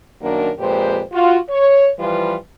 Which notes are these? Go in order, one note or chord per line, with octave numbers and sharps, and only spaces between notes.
F#2 D#3 A#3 D4 F#4 A#4
F2 A#2 G#3 G4 B4 C5
F4 F#4
C#5
E3 F3 G3 F4 B4